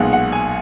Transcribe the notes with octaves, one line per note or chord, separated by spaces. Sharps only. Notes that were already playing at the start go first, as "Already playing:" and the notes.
Already playing: B1 A#2 G#3 B3 F#5
F#5
G#5